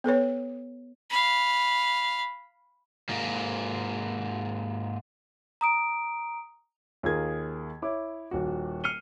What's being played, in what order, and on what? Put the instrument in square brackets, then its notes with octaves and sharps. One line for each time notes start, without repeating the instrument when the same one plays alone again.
[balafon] B3 A4 B4 C#5
[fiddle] F5 B5
[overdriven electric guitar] G#2 A#3
[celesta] A#5 D#6 D7
[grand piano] D#2 F4 G#4 A#4 G#6
E4 C#5 D6
D#1 F#4
F6 C7 C#7 D#7 G7